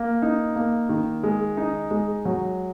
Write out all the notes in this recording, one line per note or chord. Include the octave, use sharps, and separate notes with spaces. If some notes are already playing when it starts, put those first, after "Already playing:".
Already playing: A#3
D#4
A#3
D#3
G#3
D#4
G#3
F#3